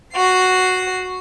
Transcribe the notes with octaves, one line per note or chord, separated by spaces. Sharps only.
F#4 C7